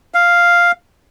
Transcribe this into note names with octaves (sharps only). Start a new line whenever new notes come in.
F5